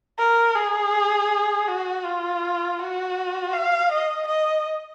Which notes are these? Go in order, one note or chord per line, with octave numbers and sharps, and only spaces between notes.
A#4
G#4
F#4
F4
F#4
F5
D#5
D#5